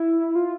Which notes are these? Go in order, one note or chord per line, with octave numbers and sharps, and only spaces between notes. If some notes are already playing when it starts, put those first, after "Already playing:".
Already playing: E4
F4